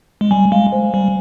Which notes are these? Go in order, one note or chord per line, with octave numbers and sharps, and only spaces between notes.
G#3
G3 G#5
G#3 F5
C5
G3 C5